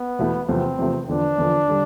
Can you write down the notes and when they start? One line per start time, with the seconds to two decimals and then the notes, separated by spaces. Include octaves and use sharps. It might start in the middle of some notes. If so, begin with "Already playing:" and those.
Already playing: B3
0.19 E2 B2 A3 E4
0.49 E2 C3 F3 A3 C4
0.79 E2 C3 F3 A3
1.08 E2 D3 F3 D4
1.38 E2 D3 F3
1.69 D3 G3